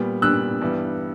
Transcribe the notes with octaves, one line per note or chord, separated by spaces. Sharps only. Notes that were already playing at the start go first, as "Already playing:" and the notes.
Already playing: A#2 G3 B3
A#2 G3 B3 E6 F#6
G2 E3 G3 B3